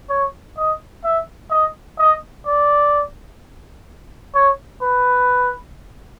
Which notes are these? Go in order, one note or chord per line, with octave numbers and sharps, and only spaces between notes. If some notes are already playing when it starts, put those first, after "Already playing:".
C#5
D#5
E5
D#5
D#5
D5
C#5
B4